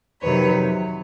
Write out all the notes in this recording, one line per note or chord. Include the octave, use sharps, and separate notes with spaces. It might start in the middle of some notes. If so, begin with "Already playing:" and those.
F2 C3 D#3 F#3 B4 C#5